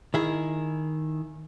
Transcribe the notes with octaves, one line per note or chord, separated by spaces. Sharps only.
D#3 E4 G#4